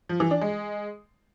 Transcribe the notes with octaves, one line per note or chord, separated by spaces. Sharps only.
F3
E3
D4
G#3